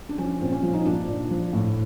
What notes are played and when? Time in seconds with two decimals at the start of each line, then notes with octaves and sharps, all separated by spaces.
0.09 D4
0.18 F3 C#4
0.41 A#2 C4
0.52 C#4
0.63 F3
0.73 D#4
0.85 A#2 D4
1.08 A#2
1.30 F3
1.53 A2